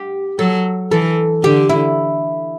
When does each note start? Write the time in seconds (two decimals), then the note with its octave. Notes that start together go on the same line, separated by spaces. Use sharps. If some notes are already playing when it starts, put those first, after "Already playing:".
Already playing: G4
0.39 F#3 A4
0.91 E3 A4
1.44 D3 G4
1.69 E4